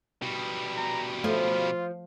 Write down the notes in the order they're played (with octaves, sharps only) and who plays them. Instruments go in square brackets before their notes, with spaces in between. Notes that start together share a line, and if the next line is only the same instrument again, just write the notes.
[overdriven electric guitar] B2 G3
[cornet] A#5
[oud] F3 [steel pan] A3 [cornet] F4